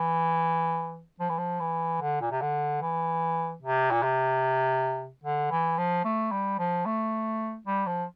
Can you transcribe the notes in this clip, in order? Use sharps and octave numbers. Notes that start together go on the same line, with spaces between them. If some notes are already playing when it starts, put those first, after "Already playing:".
Already playing: E3
F3
E3
F3
E3
D3
A#2
C3
D3
E3
C3
A#2
C3
D3
E3
F3
A3
G3
F3
A3
G3
F3